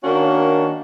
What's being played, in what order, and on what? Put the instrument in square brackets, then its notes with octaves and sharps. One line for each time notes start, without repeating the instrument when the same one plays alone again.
[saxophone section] D#3 A#3 C#4 D4 F#4